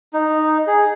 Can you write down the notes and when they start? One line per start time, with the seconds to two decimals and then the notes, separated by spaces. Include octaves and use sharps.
0.13 D#4
0.67 G#4